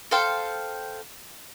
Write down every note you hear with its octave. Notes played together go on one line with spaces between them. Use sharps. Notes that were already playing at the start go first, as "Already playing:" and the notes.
A4 C5 F5 G5